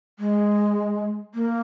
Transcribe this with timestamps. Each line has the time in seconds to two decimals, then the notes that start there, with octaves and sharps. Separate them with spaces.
0.19 G#3
1.35 A#3